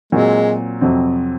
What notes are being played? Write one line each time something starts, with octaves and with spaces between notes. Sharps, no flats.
A#2 F#3 G#3 C4
F2 C3 F#3 C4